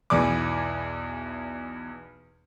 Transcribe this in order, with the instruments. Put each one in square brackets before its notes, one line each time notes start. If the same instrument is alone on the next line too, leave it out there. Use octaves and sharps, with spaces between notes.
[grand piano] B1 E2 E3 G#4 D5 D6